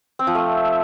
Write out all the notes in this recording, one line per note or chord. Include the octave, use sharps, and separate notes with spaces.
C4
F3
A3